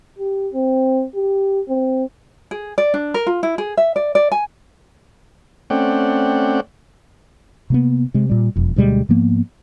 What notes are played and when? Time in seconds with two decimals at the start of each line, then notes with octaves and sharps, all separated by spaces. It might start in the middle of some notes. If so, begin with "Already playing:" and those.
0.18 G4
0.54 C4
1.15 G4
1.69 C4
2.51 G#4
2.78 D5
2.94 D4
3.14 A#4
3.27 F4
3.43 E4
3.58 G#4
3.77 E5
3.96 D5
4.15 D5
4.32 G#5
5.70 A3 C4 C#4 D5 F#5 G5
7.70 C3 A#3 B3
8.14 C3 G#3
8.30 A#2 G3
8.56 E1 F2
8.76 D2 B2 G3 G#3
9.09 G#2 F3 A#3 B3